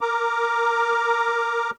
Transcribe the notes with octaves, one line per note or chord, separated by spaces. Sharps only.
A#4 A#5 D6